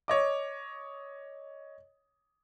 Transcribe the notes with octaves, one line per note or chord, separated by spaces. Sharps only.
C#5 D#5 D6